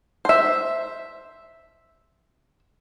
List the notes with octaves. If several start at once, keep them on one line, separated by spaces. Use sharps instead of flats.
C5 E5